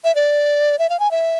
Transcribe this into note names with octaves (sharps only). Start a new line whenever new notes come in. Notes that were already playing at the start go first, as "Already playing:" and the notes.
E5
D5
E5
F5
G#5
E5